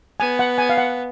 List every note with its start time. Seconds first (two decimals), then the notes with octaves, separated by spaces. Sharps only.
0.20 B3 G#5
0.39 F#5
0.58 G#5
0.69 F5
0.78 F#5